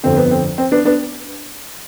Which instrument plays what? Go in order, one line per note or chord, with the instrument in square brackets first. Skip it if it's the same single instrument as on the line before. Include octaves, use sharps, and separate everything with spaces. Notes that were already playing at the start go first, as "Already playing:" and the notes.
[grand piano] G1 F2 D3 C4
B3
C4
C4
B3 D4
B3 D4